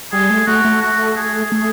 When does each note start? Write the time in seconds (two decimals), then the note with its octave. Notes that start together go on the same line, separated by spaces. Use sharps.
0.12 G3 G#4
0.30 A3
0.47 A3 F#4
0.65 A3
0.82 F#4
1.17 G#4
1.52 A3